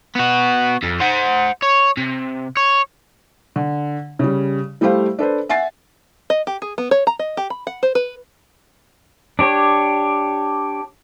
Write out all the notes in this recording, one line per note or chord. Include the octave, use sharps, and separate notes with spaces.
B3 F#4
F2
C5 F#5
C#5
C3
C#5
D3
C#3 G3
G3 A3 E4 G4 C5 F5
D4 A4 B4 C5
E5 F#5 G#5 A6 C7
D#5
G4
G#4
B3
C#5
A#5
D#5
G4
B5
F#5
C5
B4
D4 G4 C#5